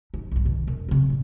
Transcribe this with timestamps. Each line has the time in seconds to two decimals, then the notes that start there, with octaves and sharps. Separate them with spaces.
0.14 D#4
0.31 B1 G2
0.45 B2 D#3
0.68 E1
0.88 C#3 C4
1.10 A#2